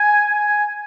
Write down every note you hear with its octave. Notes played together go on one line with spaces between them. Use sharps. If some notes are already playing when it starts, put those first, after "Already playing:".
Already playing: G#5
G#5